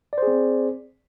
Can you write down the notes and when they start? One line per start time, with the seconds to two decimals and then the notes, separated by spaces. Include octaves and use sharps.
0.13 D5
0.18 C5
0.23 G#4
0.27 C4